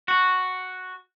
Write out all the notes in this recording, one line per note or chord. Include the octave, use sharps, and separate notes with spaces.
F#4